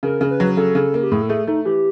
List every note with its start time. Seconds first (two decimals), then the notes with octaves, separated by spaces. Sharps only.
0.03 C#3 A#4
0.21 C#3
0.31 B4
0.40 F#3
0.57 C#3 A4
0.75 C#3
0.94 A#3
1.03 G4
1.12 A2 G#4
1.22 A4
1.29 A3 G#4
1.47 A3 D#4
1.65 E3 G4